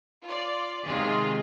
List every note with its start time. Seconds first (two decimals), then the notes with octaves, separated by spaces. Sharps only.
0.24 F4 D5
0.85 C3 D#3 G#3 F4 G#4